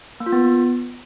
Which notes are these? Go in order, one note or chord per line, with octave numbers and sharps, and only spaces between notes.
A#3
F4
B3